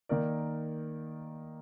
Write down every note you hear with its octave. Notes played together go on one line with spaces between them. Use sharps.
D#3 A#3 D#4 A#4 D5